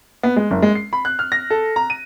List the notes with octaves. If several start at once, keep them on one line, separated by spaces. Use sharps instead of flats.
B3
G#3
F#1
G#3
C7
B5
F#6
F6
A#6
A4
A#5
D#7